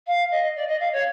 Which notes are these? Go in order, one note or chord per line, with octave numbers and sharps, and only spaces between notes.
F5
D#5
D5
D#5
F5
C#5